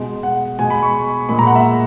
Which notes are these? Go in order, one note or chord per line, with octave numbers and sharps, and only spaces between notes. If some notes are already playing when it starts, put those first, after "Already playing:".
Already playing: B2 G#3
F#5
B2 G#3 G#5
B5
C#6
A#2 G#3 B5
A#5
F#5
E5